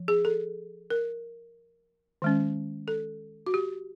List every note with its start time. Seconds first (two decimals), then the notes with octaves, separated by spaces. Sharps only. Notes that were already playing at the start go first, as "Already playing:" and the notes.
Already playing: F3
0.08 G#4
0.25 A4
0.90 A#4
2.22 D#3 G#3 C#4
2.88 A4
3.47 F#4
3.54 G4